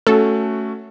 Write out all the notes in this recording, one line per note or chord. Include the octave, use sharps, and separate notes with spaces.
A3 C#4 F#4 A4